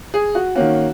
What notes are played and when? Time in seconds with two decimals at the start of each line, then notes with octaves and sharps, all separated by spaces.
0.14 G#4
0.35 F#4
0.56 D#3 A#3 C#4 F#4